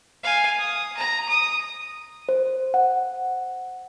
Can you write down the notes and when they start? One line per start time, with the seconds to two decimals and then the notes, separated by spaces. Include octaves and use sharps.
0.24 F5 G#5
0.58 D#6
0.97 A#5
1.29 D#6
2.29 C5
2.74 F#5